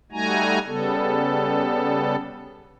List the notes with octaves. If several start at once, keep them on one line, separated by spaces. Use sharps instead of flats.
G3 A3 D#4 F#4 G#5 A#5
C#3 G3 B3 A4